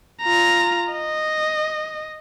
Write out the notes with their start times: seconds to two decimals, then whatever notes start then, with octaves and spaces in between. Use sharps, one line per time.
0.22 F4 A#5
0.93 D#5